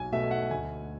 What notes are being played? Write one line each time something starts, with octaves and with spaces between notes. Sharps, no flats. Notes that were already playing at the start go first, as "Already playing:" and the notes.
Already playing: B1 G#5
B2 A3 E5
F#5
D2 G#5